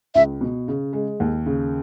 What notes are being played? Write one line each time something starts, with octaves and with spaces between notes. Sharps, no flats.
C#2 E5
B2
C#3
G#3
D#2
C#3